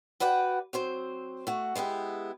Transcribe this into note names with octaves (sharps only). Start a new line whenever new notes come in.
F#4 B4 D5 F#5 G5
F#3 C4 C5
A3 F#4
G#3 B3 E4 G4